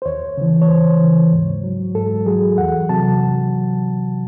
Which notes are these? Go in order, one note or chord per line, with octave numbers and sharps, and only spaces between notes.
C5
D#2 C#5
C#3 E3
C#5
D#2 C5
C#3 E3
G#2
F#3
G#2 A4
F#3 G#4
E2 F#5
C3 F#3 A5